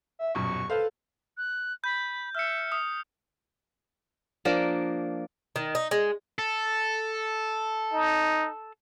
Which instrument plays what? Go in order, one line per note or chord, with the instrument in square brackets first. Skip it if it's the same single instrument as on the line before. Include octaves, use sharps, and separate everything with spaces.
[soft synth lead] E5
[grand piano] D#1 F#2 B2 [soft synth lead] C#6
[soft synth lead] A4 [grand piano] B4 C5 F5
[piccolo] F#6
[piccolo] B5 [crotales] G6
[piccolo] E5 [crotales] F6 C#7
[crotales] D#6
[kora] F3 A#3 D4 A#4
[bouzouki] D#3
D#4
G#3
[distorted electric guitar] A4
[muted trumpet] D#4